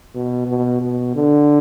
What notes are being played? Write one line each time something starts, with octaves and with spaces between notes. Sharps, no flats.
B2
B2
B2
D3